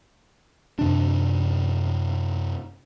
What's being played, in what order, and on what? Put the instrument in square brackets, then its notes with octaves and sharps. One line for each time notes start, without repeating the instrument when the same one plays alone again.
[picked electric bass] F#2 C3 D4